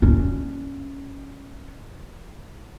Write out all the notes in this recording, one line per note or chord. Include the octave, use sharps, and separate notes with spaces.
C#4 D4